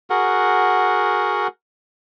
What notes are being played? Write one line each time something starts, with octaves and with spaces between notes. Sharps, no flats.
F#4 G#4 A#4 F#5